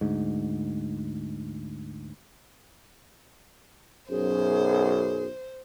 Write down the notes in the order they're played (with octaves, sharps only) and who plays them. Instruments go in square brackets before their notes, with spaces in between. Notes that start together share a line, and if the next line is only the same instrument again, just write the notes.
[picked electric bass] D2 G#2
[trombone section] B1 F#2 [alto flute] G#4 [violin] C5